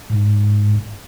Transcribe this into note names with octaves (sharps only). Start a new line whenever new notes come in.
G#2